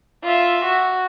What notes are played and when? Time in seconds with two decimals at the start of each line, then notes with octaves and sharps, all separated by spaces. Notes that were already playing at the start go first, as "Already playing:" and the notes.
0.24 F4 E5
0.65 F#4